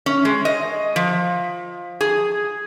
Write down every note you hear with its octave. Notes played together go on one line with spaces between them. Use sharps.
C#4
G#3
D#5
F3
G#4